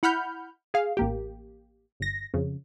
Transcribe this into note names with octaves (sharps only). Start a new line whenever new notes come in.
E4 F#5 B5 F6 G6
G#4 F5
A1 A#3 G4
G1 A#6
F2 C#3